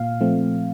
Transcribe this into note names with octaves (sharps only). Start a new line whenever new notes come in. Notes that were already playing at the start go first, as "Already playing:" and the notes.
Already playing: A#2 F5
F3 A3 C4